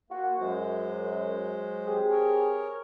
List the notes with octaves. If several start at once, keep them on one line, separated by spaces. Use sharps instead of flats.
A#3 F4 F#4
F#2 F#3 G#3 C5
C4 G4 G#4
A#4 C#5